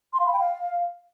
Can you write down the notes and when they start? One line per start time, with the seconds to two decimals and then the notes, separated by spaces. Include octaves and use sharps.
0.13 C6
0.20 F5
0.26 B5
0.33 G5
0.39 F5